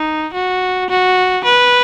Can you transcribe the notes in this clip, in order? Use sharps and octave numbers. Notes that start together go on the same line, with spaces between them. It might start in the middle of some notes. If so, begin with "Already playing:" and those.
Already playing: D#4
F#4
F#4
B4